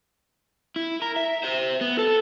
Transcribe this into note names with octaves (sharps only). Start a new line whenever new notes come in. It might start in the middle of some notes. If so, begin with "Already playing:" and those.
E4
A#4
E5
C5 E5
B3
A4